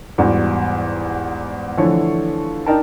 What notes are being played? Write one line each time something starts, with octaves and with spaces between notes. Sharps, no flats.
E2 G#2 G3 F#4
D3 E3 F3 A3 C#5
D4 D#4 A#4 G5 A5